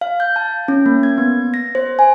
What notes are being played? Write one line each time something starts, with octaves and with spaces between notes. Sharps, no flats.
F5
G6
A5
C#4
A#3
G#6
B3
A#6
C5
G#5